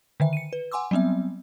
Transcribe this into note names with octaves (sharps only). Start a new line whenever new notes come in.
D3 D#3 E5
C#7 D#7
B4
F#5 G#5 C6 D6 E6
F#3 G3 B3 C4 E5